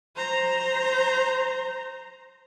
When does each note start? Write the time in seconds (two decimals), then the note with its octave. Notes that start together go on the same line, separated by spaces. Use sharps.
0.16 C5 A#5